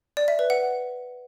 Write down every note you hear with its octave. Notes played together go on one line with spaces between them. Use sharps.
D5
E5
B4
F#5